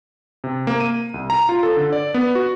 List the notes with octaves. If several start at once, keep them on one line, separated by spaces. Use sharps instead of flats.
C3
A#3
D#7
C2
A#5
F4
A4
D3
D5
B3
F#4